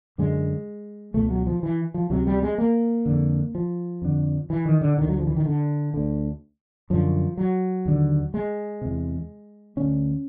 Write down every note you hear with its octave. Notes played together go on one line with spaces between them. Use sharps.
F#2 D3 G#3
C#2 B2 A3
F#3
F3
E3
F3
C#2 C3 F#3
G3
G#3
A#3
F2 D3
F3
F2 D3
E3
D#3
D3
D2 D3 D#3
F#3
F3
E3
D#3
D3
D2 D3
F#2 D3 F3
F#3
D#2 D3
G#3
E2 C3
D2 D3 C#4